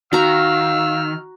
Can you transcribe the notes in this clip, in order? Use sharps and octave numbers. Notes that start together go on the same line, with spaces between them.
D#3 F#4 F5 A#5 E6 F6